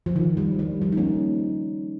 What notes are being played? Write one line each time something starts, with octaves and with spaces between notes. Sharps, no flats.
F3
D#3
G3
G3
F3
D#4
A#3 C#4